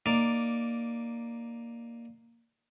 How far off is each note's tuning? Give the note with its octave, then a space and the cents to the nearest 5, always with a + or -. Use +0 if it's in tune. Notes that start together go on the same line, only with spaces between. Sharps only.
A#3 +0 D#4 +0 D5 +0